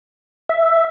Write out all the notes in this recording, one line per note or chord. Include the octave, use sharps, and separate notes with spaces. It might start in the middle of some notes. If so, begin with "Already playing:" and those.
E5